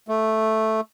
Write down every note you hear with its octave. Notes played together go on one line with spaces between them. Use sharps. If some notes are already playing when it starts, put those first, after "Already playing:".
A3